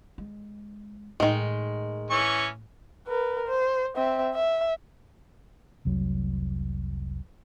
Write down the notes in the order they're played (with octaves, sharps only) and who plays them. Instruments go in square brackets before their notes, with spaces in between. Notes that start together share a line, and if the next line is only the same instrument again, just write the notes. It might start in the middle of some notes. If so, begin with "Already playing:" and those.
[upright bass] G#3
[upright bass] A2 [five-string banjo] D#3 G#3
[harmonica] E3 C#4 C#6
[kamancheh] A#4 B4
C5
C4 E5
E5
[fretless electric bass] F1 C2 F#3